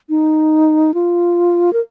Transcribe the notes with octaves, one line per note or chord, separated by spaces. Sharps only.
D#4
F4
A#4